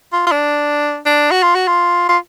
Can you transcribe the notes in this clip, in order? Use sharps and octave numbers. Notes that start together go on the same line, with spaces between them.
F4
F4
D4
D4
F#4
F4
F#4
F4
F4